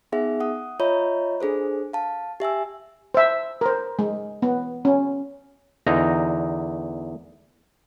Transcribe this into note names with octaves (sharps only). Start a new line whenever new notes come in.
B3 D#4 G#4 E5 F#5
F#5 D#6
F4 C#5 D#5 E5 A#5 B5
D4 G#4 A4 C5
F5 A5
G4 E5 G#5 E6
C5 E5
A#4 C5
G#3
B3
C#4
E2 D3 D#4 A#5